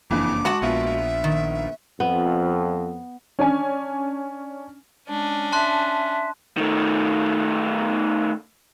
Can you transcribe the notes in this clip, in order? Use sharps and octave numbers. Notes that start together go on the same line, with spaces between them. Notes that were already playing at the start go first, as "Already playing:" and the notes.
F#1 F2 E3 A#3 D4 D6
G#3 F#4 F#5 A5
A#1 B3 F4 E5
D#3
F2 B3
C#4 D4 G#5
G#3 C#4 D4
E5 A5 C6 F#6
D#3 A3